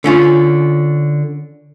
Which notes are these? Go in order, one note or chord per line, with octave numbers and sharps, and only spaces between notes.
D3 C#4 F4